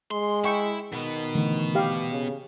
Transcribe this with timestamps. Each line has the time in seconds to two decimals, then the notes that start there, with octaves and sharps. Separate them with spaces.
0.11 G#3 C6
0.44 E4 E5 G5 C#6
0.93 B2 D#3 B3
1.35 D3 E3 A3
1.75 G4 F5
2.11 C#3